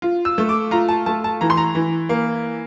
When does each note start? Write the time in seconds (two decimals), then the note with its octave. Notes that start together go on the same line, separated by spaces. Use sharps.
0.02 F4
0.25 E6
0.38 A3
0.49 D6
0.71 F4 A#5
0.89 A5
1.06 A3 A5
1.24 A5
1.41 E3 A#5
1.50 C6
1.57 A#5
1.75 E3
2.09 A#3